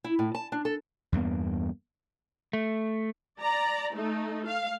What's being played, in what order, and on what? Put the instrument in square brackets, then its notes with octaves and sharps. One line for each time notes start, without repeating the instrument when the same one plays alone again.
[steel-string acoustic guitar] E4
A2
A5
D4
A4
[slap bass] E2 G2 A#3 B3
[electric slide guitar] A3
[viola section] D5 A#5
A3 D#4
F5